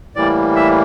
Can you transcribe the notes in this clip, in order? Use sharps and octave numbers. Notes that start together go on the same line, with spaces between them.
A2 E3 G3 A#3 D5
E5